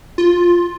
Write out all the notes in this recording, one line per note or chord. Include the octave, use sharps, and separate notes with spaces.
F4